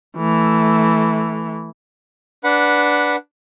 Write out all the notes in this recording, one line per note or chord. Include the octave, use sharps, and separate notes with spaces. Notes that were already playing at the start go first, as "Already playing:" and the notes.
E3 A3
D4 B4 F#5